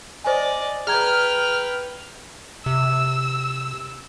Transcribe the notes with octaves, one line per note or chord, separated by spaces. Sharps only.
C5 D5 D#5 G#5
G#4 B4 G5 A#5 F6 G#6
C3 E6